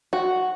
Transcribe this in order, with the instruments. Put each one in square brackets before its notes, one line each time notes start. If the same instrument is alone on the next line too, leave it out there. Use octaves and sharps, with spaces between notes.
[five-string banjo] F#4